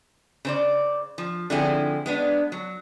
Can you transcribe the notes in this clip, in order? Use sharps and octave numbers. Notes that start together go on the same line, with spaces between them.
C#3 C5 D5
F3
D3 F3 C4 C#4 E4 G#4
G#3 B3 D4
F#3